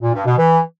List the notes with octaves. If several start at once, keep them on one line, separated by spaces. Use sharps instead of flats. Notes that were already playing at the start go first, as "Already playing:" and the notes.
A#2
G2
B2
E3